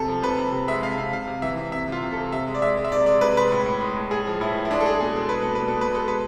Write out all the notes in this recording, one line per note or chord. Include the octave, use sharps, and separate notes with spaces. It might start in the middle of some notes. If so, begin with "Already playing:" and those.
Already playing: C3 A4
F3
C3 B4
C3
C3
G#3 E5
C3 F5
C3 F5
C3 F5
C3
E3 E5
C3
C3 E5
C3 F4
C3
A4
C3
C3 E5
G#3
D5
G#3 E5
G#3
E5
C3 D5
G#3 D5
C3 B4
G#3 B4
A2
A2
G#3
A2
A2 G#4
F3
A2 E4
F3
E4
G#3 D4
A4
G#3 G#4
B2 G#4
G#3 A4
G#3 B4
B2 A4
B4
B2
A4
B2 B4
G#3 A4
G#3 B4